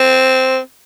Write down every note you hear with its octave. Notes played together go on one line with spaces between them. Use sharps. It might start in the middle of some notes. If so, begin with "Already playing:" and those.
Already playing: C4